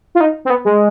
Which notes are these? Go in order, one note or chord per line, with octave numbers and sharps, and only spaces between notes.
F4
D#4
C4
B3
G#3